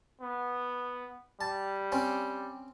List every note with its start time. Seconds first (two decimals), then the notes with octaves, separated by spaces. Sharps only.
0.21 B3
1.41 G3 A5
1.92 C4 C#4